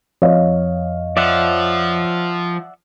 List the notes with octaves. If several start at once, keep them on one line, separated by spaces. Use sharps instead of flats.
F2 C#5 D#5 F5
F3 D5 E5 F#5